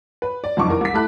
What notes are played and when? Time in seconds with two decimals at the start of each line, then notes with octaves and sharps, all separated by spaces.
0.22 B4
0.44 D5
0.57 F#1 F2 D#4 C#6 D6
0.69 E2 A#4
0.81 C2 B6
0.94 A3 E4 A5 B5 F#6